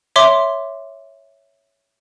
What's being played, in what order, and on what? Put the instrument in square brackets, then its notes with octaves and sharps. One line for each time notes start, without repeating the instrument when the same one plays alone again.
[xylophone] C#5 E5 C6 D6